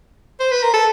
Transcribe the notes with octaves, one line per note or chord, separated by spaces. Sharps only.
C5
B4
A#4
A4